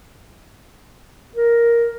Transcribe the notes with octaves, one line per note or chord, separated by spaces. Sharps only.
A#4